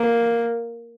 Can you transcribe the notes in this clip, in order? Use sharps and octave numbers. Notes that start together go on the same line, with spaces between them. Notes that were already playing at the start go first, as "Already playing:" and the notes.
Already playing: A#3